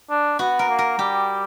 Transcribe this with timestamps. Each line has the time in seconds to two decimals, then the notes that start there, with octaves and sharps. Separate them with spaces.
0.10 D4
0.39 B3 F#4
0.59 A#4
0.69 A#3
0.79 A#4
0.99 G3 G4